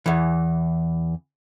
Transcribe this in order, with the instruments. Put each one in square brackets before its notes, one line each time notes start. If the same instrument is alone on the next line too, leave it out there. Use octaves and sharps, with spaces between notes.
[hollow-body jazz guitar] E2 E3